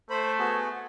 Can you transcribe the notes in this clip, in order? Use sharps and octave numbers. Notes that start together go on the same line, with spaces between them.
A3 C5 B5
B3 F#4 G#4